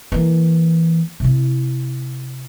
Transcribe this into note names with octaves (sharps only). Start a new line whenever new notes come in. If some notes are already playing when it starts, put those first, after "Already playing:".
E3 A#3
C3 E4